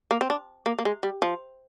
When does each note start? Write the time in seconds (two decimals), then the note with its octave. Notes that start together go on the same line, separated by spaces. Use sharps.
0.11 A#3
0.21 C4
0.30 D4
0.66 A#3
0.79 A#3
0.85 G#3
1.03 G3
1.22 F3